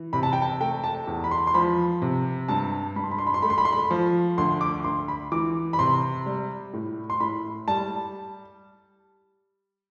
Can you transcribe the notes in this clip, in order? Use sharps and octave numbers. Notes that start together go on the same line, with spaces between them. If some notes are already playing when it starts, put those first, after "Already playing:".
Already playing: E3
C3 B5
A5
G5
A5
A3 G5
A5
E2
B5
C6
C6
F3 B5
C3
G2 A5
G2 B5
C6
B5
C6
B5
C6
A3 B5
C6
B5
C6
B5
F3
D2 C6
D6
D2 C6
B5
E3 D6
B5
C3 C6
G3
A2
C6
A2 B5
G3 A5